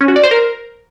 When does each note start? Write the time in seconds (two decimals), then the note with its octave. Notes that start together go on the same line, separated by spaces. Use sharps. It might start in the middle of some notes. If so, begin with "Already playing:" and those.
0.01 C#4
0.08 F#4
0.16 D5
0.23 C5
0.31 A#4